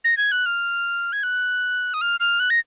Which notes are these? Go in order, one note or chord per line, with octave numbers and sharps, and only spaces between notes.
A#6
G#6
F#6
F6
G#6
F#6
D#6
F6
F6
F#6
A#6